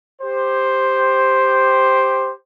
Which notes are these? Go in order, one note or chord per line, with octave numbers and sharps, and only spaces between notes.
G4 C5